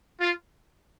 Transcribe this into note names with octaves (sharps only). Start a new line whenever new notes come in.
F4